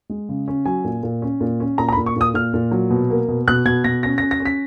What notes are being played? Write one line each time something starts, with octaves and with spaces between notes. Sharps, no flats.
G#3
C#3
C#4
F#3 G#5
A#2
A#2
C#4
A#2
C#4
A#2 A#5
A#5
B5
A#2
C#6
A#2 D#6
A#2 F6
A#2
F#3
B2
A#3
B2
B2 F#6
B2 G#6
B2 A#6
C#4 A#6
A#6
C#4
A#6
C#4
B6